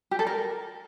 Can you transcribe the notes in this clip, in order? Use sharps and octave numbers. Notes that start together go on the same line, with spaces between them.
G4
A4
A#4